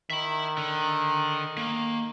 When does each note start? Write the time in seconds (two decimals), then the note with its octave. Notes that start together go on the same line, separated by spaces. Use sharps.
0.10 D#3 E5 B5
0.58 D3
1.57 A#3